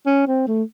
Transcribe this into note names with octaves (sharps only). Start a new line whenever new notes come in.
C#4
C4
A3